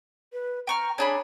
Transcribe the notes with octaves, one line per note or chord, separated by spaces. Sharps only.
B4
G5 A#5 C#6 F6
D4 G#4 C#5 B5